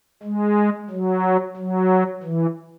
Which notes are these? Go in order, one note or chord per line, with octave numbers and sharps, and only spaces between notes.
G#3
F#3
F#3
E3